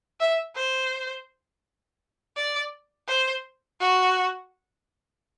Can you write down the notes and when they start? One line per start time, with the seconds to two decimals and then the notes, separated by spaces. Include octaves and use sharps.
0.20 E5
0.55 C5
2.36 D5
3.08 C5
3.80 F#4